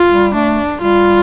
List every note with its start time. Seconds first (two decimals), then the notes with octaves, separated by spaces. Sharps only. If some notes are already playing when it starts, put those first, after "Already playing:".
Already playing: F4
0.11 G3
0.34 A3 D4
0.82 G3 F4